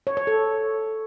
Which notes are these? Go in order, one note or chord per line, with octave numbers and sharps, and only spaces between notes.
C#5
C#5
A4